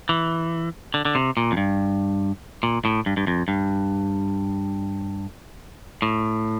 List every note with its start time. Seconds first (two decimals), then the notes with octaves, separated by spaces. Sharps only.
0.09 E3
0.94 D3
1.05 D3
1.15 C3
1.37 A#2
1.52 F2
1.57 G2
2.63 A#2
2.85 A2
3.06 G2
3.17 G2
3.27 F2
3.48 G2
6.02 A2